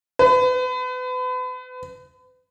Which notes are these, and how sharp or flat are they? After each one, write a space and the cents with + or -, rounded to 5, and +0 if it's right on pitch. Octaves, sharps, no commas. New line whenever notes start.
B4 +35